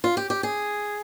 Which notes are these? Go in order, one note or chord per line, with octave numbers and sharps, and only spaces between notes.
F4
G4
G4
G#4